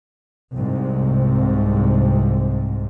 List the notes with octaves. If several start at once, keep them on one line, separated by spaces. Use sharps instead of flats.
C2 G#2 C3